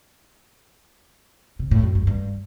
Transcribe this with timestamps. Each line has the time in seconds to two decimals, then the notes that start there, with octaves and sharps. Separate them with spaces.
1.59 C3
1.71 A2
1.83 F#2
1.95 G2
2.07 G2